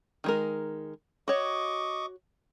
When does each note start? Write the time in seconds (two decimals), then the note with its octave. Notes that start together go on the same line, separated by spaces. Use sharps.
0.24 D#3 G#3 A#4
1.28 F#4 C#5 D#5 C#6 D6